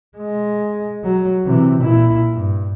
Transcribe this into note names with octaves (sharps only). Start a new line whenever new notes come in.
G#3
F#3
C3 E3
A#2 E4
G2